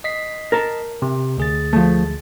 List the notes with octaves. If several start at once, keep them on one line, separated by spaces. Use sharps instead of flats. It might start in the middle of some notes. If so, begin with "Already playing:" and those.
D#5 B6 C7
A#4 A5
C3
D2 G#4 A6
F3 A3